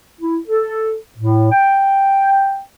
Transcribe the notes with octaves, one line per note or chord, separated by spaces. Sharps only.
E4
A4
A2
G5